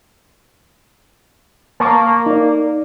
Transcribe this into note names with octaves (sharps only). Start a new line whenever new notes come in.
A#3 A5 C#6
D#4 D5